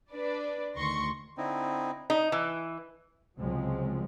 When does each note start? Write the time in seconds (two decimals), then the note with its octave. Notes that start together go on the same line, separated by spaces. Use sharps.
0.12 D4 B4 D5
0.74 D2 D#3 C6 C#6 A#6 C#7
1.37 D3 C4 D#4 E4
2.10 D#4
2.32 E3
3.38 C#2 C3 F3 F#3 G#3 C4